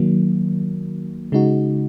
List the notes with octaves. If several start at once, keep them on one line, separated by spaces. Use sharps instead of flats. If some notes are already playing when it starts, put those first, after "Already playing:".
Already playing: D#3 F#3 A#3
C#3 G#3 D#4 F#4